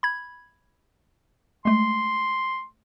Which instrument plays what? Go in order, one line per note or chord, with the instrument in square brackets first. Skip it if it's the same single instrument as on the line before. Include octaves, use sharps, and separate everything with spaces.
[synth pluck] B5 G#6
[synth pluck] G#3 A3 [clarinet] C6